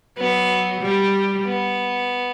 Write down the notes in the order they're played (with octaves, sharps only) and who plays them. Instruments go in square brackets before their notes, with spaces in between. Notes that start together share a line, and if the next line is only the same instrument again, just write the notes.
[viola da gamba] F#3 [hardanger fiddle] B3
[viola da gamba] G3
[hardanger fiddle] B3